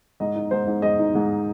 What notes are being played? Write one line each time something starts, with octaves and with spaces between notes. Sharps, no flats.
G#2 D#5
D#4
G#2 C5
G#2
G#3 D#5
D#4
G#2